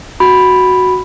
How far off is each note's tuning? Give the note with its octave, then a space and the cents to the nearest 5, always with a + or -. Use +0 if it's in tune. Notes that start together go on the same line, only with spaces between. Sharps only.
F#4 +0 B5 +0